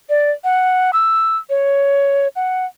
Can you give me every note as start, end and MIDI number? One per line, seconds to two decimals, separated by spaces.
0.09 0.31 74
0.44 0.91 78
0.93 1.37 88
1.50 2.28 73
2.36 2.65 78